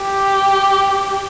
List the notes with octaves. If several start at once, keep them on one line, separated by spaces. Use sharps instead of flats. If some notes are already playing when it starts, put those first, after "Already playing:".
Already playing: G4